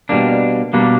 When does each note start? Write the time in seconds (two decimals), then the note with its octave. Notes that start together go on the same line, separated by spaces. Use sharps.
0.09 B2 G3 A#3 D4
0.73 B2 G3 A#3 D4